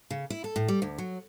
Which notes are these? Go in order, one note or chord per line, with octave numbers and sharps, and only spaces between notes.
C#3
E4
A4
A2
G3
D2
F#3